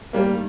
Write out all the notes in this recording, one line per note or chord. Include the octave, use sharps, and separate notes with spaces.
G2 D#3 G3 A3 A#3